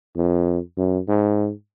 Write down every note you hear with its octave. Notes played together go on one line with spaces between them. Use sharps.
F2
F#2
G#2